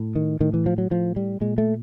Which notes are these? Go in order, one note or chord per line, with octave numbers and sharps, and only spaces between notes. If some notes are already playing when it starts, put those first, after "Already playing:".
Already playing: A2
D#3
A2 D#3
E3
F3
F#3
A2 F3
G3
A#2 G#3
A3